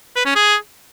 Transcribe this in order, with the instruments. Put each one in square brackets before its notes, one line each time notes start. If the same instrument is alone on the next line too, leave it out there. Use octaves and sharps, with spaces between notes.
[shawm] B4
C#4
G#4